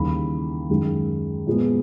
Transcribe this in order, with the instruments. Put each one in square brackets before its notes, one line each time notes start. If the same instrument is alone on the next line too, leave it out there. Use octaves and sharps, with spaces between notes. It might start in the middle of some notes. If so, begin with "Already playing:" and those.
Already playing: [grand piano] D#2 C#3 E3 G3 B5
F#2 D#3 G#3
A#2 F3 G#3 B3